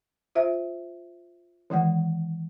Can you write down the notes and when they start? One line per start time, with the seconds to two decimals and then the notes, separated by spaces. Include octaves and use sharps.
0.35 F4 C5 E5
1.70 D#3 E3 G#3 F#5